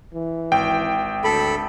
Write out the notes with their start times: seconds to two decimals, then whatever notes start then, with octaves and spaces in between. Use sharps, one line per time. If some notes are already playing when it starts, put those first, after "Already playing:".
0.13 E3
0.52 G#1 G5
1.24 D2 A4 B5